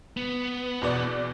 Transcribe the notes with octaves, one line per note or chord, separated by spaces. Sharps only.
B3
E2 B2 D5